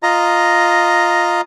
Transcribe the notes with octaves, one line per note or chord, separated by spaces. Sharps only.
F4 D#5 A#5